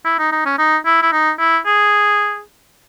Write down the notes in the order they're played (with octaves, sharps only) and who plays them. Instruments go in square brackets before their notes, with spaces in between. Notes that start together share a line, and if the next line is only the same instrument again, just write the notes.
[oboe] E4
D#4
D#4
C#4
D#4
E4
E4
D#4
E4
G#4